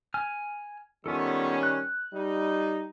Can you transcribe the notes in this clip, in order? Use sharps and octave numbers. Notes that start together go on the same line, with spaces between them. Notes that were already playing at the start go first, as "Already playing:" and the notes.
G#5 F6
D#3 G3 B3 C#4 F4 A4
F#6
G3 D#4